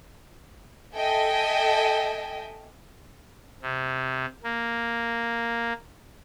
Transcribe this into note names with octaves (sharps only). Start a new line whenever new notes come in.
A4 D#5 E5 G5 G#5
C3
A#3